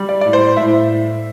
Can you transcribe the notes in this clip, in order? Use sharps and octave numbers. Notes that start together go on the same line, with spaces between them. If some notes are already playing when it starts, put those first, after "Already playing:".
Already playing: G3
D5
A2 D5
C5
A2 E5